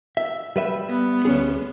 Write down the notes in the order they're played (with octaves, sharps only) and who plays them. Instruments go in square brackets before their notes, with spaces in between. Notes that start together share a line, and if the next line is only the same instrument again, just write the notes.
[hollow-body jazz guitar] E5
G3 B4 E5
[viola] B3
[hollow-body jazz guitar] D2 C#4 G#4